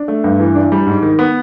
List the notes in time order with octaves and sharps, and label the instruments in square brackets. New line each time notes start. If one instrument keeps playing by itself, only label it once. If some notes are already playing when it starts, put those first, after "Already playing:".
Already playing: [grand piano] D4
A3
G2
E3
D4
G3
G#2
D#3
B3